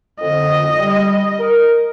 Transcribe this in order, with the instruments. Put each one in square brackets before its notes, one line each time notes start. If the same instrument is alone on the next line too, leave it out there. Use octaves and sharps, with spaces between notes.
[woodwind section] F2 D3 [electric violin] D#5
[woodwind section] G3
A#4